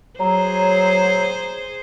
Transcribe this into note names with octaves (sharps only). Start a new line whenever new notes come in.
F#3 G#4 C5 C#5 A#5